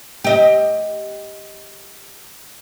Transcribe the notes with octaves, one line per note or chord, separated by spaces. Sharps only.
G4 D#5